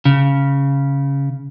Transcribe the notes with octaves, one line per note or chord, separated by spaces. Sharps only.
C#3